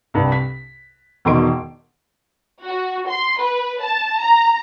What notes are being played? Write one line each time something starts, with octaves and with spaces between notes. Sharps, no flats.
C2 G2
B6
E1 B2 D#3 C6 D7
F#4
C6
B4
A5
A#5